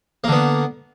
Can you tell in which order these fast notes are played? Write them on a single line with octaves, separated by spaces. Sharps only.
A#3 D3 B3